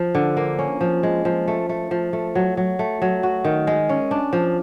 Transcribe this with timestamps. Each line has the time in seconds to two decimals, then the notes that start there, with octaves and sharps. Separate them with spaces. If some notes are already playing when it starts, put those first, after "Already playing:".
Already playing: F3
0.15 D3
0.37 A#3
0.59 C#4
0.81 F3
1.03 G#3
1.25 F3
1.48 A3
1.69 A3
1.91 F3
2.13 A3
2.35 F#3
2.57 F#3
2.79 A3
3.02 F#3
3.23 F#4
3.45 D#3
3.67 G#3
3.89 C#4
4.11 D4
4.33 F3